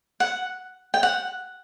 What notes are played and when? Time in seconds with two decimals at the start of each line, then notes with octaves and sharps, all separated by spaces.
0.20 F#5
0.94 G5
1.03 F#5